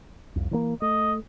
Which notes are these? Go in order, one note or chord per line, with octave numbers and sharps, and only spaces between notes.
C2 F2
E3 F3 A#3
A3 D#5